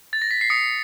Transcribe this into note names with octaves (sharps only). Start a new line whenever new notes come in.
A6
A#6
B6
C7
D#6 C#7